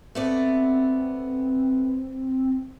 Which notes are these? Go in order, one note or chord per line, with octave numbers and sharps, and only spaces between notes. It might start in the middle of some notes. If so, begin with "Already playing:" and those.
A3 B3 C4 D5